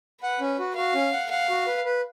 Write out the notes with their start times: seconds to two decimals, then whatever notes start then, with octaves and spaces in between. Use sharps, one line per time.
0.23 B4 F#5
0.41 C#4
0.59 F#4
0.76 F#4 F5
0.94 C#4
1.13 F#5
1.31 F5 F#5
1.49 F#4
1.67 B4
1.85 B4